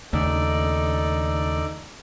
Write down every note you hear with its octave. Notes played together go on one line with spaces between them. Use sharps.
D#2 C#3 A3 D#4 A4 D5